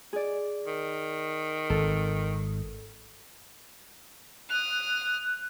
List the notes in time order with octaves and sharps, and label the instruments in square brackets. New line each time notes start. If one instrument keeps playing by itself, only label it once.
[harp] G#4 D5
[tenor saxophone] D#3
[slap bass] G#1 [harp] A4
[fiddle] D#6 F6 [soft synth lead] F#6